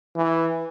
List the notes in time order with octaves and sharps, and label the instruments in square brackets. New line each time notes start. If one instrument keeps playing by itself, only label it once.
[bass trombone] E3